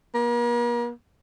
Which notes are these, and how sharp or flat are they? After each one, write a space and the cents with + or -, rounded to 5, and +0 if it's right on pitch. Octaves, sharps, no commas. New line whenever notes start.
A#3 +40